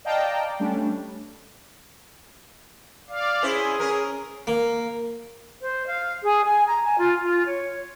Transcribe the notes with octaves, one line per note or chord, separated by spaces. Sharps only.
D5 D#5 F5 G5 A5 A#5
D5
G3 A3 C#4 D4
D5 F5
C#4 E4 G#4 C5
C#4 A#4
A#3
C5
F5
G#4
G#5
A#5
G#5
F4
F4
C#5